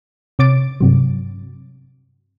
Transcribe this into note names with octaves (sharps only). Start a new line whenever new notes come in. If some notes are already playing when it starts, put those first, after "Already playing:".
C3 C#5 D6 A6 D7
G2 C3 F#3